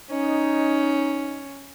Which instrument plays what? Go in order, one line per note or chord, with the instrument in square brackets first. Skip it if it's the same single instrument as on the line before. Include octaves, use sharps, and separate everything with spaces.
[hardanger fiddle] C#4 [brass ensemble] D#4